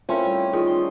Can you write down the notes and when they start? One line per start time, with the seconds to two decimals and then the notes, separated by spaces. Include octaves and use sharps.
0.09 A3 C4 C#4 E4 F4 A#4 C#5
0.25 G3
0.53 D#3 F4 G#4
0.68 D4 C6